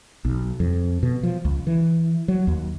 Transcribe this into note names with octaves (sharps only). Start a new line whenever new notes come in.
B1
F2
B2
F3
C#2
E3
F#3
D#2